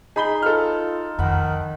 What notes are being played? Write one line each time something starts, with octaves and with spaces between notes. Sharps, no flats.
D#4 G#4 B5 G7
F4 A4 F6
F2 D#3 F#5 B5